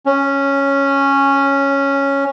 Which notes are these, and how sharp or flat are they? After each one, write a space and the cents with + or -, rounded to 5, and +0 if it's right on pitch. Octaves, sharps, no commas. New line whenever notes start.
C#4 -5